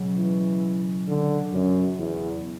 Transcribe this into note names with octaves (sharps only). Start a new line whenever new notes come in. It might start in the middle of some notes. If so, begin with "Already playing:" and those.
Already playing: C#2 B2 F#3 C#4 F#4
E3
D3
F#2
E2